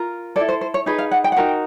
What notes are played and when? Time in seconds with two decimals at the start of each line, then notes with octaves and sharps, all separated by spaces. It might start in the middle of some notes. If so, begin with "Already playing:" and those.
Already playing: F4 A#4
0.36 A4 D5
0.40 E4
0.49 C5
0.61 C5
0.74 C#5
0.86 D#4 G#4 B4 D#5
0.99 F5
1.11 F#5
1.24 G5
1.32 F#5
1.37 D#4 F#4 A#4 G5